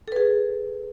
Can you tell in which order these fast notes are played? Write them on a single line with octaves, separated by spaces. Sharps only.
A4 B4 G#4